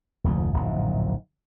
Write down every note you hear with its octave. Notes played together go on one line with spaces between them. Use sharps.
F1 D2 G#2 F3
D1 A#1 F#2 D#3